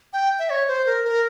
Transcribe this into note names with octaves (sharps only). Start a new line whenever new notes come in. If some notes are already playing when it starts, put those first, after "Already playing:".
G5
E5
C#5
C5
A#4
A#4